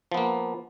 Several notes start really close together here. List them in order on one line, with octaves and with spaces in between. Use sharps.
F3 B3 A#3